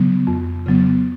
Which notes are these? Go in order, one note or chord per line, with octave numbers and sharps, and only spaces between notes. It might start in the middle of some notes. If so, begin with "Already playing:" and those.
Already playing: C#3 F#3 B3
F2
C#3 F#3 B3